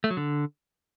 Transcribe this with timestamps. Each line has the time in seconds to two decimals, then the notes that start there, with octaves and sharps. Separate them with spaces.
0.04 A3
0.10 F#3
0.17 D3